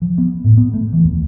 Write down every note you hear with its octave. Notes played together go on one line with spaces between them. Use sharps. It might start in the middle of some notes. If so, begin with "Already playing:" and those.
F3
B3
A2
B3
A3
E3
D#2